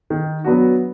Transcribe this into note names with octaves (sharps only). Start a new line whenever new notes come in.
D#3
F#3 B3 D4 F#4